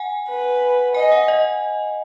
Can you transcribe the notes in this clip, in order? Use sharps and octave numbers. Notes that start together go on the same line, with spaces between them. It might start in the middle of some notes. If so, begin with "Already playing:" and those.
Already playing: F#5 G#5
B4
D#5 G#5
F#5
D#5